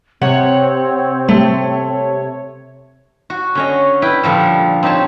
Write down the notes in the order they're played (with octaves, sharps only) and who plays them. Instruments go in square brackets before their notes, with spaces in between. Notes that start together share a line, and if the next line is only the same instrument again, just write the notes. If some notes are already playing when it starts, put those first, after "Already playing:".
[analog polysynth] C3 C#5 [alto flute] C4 [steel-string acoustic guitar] F#5
[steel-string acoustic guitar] A3
[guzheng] F#4
D3 C#4 D#5
E4 B4 G5
A#2 D3 F3 G3
C4 D#4 G4 C#5 A5